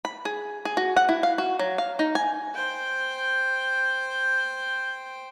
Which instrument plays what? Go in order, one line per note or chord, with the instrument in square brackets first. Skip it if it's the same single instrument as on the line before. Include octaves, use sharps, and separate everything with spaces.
[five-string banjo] B5
G#4
G#4
F#4
F#5
E4
F5
F#4
F#3
F5
D#4
G#5
[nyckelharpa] C5 G5